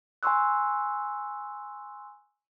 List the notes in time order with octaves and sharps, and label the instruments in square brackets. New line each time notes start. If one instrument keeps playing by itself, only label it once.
[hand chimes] G#5 A#5 C6 C#6 E6 F#6